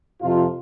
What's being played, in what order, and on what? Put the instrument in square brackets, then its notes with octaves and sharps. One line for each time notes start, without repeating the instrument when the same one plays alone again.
[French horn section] F2 C3 F3 F4